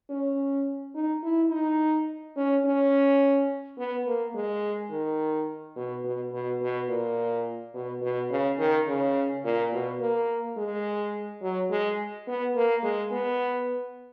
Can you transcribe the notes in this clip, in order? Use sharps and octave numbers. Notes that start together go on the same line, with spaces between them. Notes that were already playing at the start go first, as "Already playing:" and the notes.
C#4
D#4
E4
D#4
C#4
C#4
B3
A#3
G#3
D#3
B2
B2
B2
B2
A#2
B2
B2
C#3
D#3
C#3
A#2
B2
A#3
G#3
F#3
G#3
B3
A#3
G#3
B3